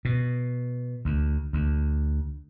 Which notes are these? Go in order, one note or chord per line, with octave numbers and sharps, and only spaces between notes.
B2
D2
D2